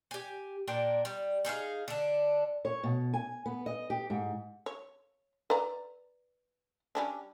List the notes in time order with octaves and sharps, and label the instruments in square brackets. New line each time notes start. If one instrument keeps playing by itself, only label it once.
[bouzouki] G4 G#5
A#2 D4 A#4 G5
G3
D#4 G#4 E5 F5
D3 D4
[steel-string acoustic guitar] C#5
B2
G#5
B3
D#5
G4
G#2
[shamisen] C#5
B4 D5 A#5
G3 C#4 D4